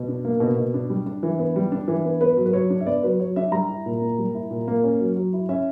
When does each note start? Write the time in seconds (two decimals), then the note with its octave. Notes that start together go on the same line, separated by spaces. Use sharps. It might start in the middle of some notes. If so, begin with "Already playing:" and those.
Already playing: B2
0.08 D4
0.25 A#3
0.40 B2
0.57 B2
0.74 D4
0.90 G3
1.06 D4
1.23 E3
1.39 B3
1.56 G3
1.72 D4
1.88 E3
2.05 B3
2.21 B3 B4
2.37 F#3
2.45 B4
2.53 F#3 C#5
2.70 D4
2.81 E5
2.86 B3 D5
3.03 F#3 B4
3.20 F#3 C#5
3.36 D4 E5
3.52 G3 A#5
3.69 E4
3.86 A#2
4.01 A#3
4.19 G3
4.35 E4
4.50 A#2
4.68 A#3
4.84 C#4
5.00 F#3
5.16 F#3
5.33 E4
5.49 C#4 E5